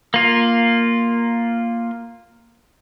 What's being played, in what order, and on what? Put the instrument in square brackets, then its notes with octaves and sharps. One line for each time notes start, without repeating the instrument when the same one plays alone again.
[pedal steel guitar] A#3 F4